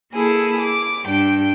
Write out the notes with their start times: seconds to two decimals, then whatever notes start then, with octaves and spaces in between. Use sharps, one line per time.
0.14 A#3 E4 G#4 A4
0.61 D6
1.05 G2 D4 G5